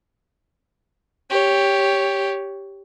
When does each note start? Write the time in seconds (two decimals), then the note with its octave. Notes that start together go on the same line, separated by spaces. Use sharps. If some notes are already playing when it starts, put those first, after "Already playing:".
1.30 G4 C#5